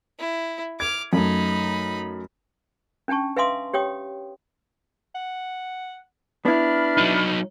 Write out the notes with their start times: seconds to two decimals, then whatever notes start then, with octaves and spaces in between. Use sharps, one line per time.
0.19 E4
0.80 D6 F6 G#6
1.13 F#2 A3 D#4 B5
3.08 C#4 D4 G5 A5 C#6
3.37 B4 E5 F5 G#5 C6 D#6
3.73 G4 C#5 G5 D#6
5.15 F#5
6.45 B3 D4 E4 B5 F6
6.97 F#3 D#4